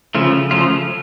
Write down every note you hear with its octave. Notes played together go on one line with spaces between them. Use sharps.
C#3 F3 A3 F4
C#3 F3 A3 F4